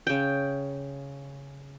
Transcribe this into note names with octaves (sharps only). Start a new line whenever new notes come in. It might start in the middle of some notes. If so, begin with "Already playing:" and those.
C#3 G5